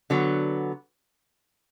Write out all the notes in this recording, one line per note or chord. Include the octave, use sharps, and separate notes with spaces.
D3 F#3 B3